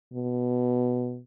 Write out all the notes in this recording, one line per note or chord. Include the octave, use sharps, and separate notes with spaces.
B2